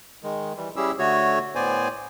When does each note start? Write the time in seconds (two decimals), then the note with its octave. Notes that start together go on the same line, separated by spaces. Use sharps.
0.24 D#3 G#3
0.57 E3 G3
0.76 G3 C#4 E4 G4 G#4 E6
0.99 D3 A3 F#4 C#5
1.55 A2 B3 C5 D5 G#5